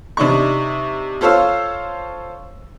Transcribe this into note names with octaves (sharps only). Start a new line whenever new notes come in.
C3 D4 D#4 C#6
F4 A4 C5 C#5 F5 E6